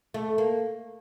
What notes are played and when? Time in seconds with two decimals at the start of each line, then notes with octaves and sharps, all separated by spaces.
0.14 A3
0.38 A#3